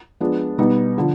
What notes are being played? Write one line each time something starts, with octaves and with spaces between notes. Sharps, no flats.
F3 G#3 B3 D4
B2 G3 B3 D#4
D3 F3